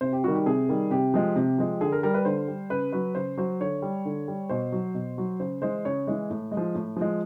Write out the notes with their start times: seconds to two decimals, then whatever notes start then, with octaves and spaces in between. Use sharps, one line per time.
0.01 C3 C5
0.13 G4
0.24 D#3 G3 F#4
0.34 G4
0.46 C3 G#4
0.68 D#3 G3
0.90 C3 G4
1.14 F3 G#3
1.36 C3
1.58 F3 G#3
1.81 D3 G#4
1.92 A#4
2.03 G3 A#4
2.14 B4
2.25 D3 C5
2.48 G3
2.70 C#3 B4
2.93 F#3 B4
3.15 C#3 C5
3.37 F#3 C5
3.60 D3 C#5
3.82 G3
4.05 D3
4.28 G3
4.49 B2 C5
4.72 F#3
4.94 B2
5.18 F#3
5.40 C#3 C5
5.62 E3 G#3 C5
5.85 C#3 C#5
6.07 E3 G#3
6.30 A2
6.52 G#3
6.57 F3
6.75 A2
6.96 F3 G#3